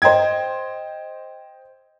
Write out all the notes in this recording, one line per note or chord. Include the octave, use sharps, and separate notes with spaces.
C5 D#5 G5 G#6